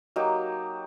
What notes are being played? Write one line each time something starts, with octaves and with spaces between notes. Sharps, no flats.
F#3 A#3 D#4 G4